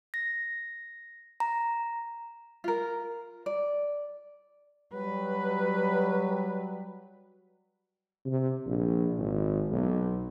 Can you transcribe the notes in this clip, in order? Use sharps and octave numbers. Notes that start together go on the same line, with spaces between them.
A#6
A#5
F4 A#4
D5
F#3 G3 B4
C3
A#1
G#1
B1